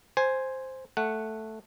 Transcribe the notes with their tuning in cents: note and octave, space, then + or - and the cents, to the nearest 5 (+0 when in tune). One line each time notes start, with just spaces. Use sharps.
C5 +0 G#5 +0
A3 +0 F#5 +0